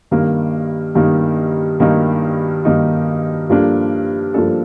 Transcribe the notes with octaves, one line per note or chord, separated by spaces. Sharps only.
G2 D#3 A#3 D#4
G2 D#3 A#3 D#4
G2 D#3 A#3 D#4
G2 D#3 A#3 D#4
G2 F3 A#3 D4 A4
G2 F3 A#3 D4 A4